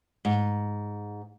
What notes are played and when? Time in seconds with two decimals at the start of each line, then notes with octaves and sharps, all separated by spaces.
0.25 G#2